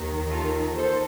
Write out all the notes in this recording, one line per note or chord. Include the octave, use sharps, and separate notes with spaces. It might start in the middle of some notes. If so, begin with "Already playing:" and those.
Already playing: D#2 D#3
F4 A4
A4 C5